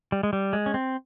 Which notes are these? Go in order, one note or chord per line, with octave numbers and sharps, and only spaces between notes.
G3
G#3
G3
G#3
C#4
C4